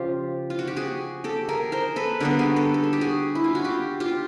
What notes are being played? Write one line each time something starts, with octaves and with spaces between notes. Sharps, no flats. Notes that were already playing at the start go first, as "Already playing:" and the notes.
Already playing: C#3 F3 F4 G4
F4
F#4
G4
F#4 G#4
G4 A4
G#4 A#4
A#4 C5
A4 B4
D3 G3 B3 G#4 A#4
F#4 G#4
G4 A4
A4
G#4
G4
F#4 G#4
E4
F4
F#4
F4 G4
F4 G4